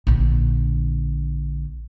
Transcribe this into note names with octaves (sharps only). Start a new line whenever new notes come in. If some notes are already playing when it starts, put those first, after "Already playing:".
A#1 D3